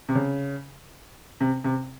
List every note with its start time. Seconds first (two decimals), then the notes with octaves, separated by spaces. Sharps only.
0.09 C3
0.15 C#3
1.40 C3
1.64 C3